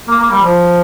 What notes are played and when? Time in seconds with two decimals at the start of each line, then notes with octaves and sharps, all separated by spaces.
0.08 A#3
0.19 A#3
0.30 G3
0.42 F3